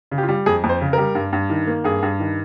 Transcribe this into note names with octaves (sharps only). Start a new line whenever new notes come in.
C#3
G4
F4
G3
F2 G#4
F2
C5
C#3
G3 A#4
G2
G2
D#3
A#3
G2 G#4
G2
D#3